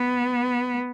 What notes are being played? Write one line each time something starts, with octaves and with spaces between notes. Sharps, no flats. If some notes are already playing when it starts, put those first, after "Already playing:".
Already playing: B3